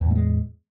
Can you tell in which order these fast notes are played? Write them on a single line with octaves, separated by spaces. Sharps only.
E2 A2 A3 G#3